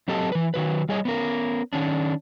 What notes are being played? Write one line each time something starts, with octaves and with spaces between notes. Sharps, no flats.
F#3 C4 G4 A4 D#5 A5
E3 B4
D#3 F#3 B4
G3 G#4 C#5 D#5
B3 C#4 A#4
D#3 C#4 D4